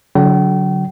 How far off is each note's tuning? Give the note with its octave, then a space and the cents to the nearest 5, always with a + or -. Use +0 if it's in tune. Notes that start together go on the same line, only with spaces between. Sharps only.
D3 -35 F#3 +0 G5 -40